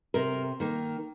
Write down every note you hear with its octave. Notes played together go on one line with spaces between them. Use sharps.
C3 A#4
D#3 A#3